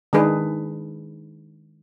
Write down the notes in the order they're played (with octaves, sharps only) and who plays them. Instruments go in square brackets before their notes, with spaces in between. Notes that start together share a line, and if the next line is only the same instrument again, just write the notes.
[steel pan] D#3 G#3 D4 G#4 B4